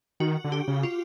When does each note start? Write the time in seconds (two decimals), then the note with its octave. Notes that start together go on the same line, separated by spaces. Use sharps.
0.20 D#3 F#4
0.44 D3
0.52 G4
0.68 C#3
0.83 F4